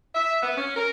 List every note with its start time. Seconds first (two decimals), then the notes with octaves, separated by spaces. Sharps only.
0.14 E5
0.42 B3
0.57 C#4
0.76 A#4